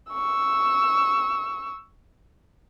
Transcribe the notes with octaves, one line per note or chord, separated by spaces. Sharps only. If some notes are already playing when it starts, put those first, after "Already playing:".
C#6 E6